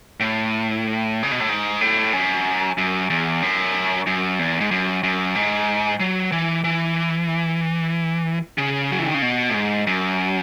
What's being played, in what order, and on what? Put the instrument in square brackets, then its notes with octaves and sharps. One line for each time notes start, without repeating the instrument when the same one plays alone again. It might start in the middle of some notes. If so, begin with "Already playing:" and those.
[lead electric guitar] A2
C#3
B2
A2
G#2
A2
F#2
F#2
E2
F#2
F#2
E2
G#2
F#2
F#2
G#2
F#3
E3
E3
C#3
F#3
E3
D#3
C#3
B2
A2
G#2
F#2